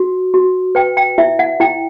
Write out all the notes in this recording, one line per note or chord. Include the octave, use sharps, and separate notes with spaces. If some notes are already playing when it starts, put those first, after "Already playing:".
Already playing: F#4
F#4
B4 G5
G5
E4 E5
F#5
E4 G5